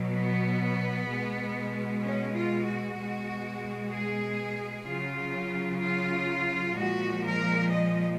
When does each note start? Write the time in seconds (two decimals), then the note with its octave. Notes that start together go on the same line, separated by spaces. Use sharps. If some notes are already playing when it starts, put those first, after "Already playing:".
Already playing: B2 F#3
0.13 B3
1.08 B2 G#3
2.02 C#4
2.33 F4
2.66 F#4
2.97 B2 G#3
3.92 G#4
4.86 C#3 F#3 F4
5.81 F4
6.75 A#2 F3 G#3 F#4
7.23 A#4
7.70 D#5